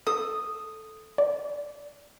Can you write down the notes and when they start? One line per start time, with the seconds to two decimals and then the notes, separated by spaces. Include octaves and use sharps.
0.07 A4 D#6
1.18 D5